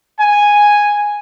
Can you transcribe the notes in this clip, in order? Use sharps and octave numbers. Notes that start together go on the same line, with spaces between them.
G#5